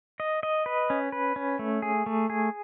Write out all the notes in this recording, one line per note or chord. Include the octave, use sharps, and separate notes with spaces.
D#5
D#5
B4
C#4
B4
C#4
A3
G#4
A3
G#4